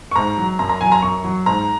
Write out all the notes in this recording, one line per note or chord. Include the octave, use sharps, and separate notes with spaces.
C#6
G#2 A#5
F#3
F#2 A#5
A#5
F#3 G#5
A#5
F#2 C#6
F#3
G#2 A#5